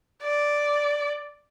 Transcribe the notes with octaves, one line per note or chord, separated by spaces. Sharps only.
D5